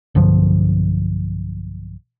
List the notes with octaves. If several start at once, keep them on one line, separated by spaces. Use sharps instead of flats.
B1 G2 D3 F3